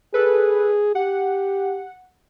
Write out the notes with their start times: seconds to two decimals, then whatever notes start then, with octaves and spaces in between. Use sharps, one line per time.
0.14 G#4 A4 B4
0.95 G4 F#5